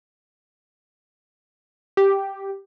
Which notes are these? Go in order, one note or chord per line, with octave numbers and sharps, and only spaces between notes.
G4